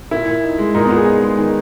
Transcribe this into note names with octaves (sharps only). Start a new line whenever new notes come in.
A#2 E4
A#2
D#4
G#3
A#2 D#4
A#2 B3
G#4
D#4
G#3
D#3